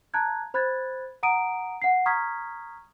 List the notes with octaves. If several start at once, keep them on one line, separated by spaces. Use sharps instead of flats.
A5 A#5 F#6 G#6
C5 B5 F#6 G#6 A6
F#5 A#5 D#6 D7 D#7
F#5 C7
A#5 C#6 D#6 F6 G#6 B6